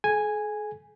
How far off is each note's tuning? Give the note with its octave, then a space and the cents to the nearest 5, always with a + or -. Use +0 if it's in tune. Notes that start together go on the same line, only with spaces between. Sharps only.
G#4 +45 G#5 -5